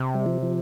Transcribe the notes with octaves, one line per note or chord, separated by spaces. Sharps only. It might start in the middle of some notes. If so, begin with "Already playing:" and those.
Already playing: C3
G3
F3
F3